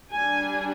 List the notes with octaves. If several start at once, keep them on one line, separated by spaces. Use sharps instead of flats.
G3 D4 G#5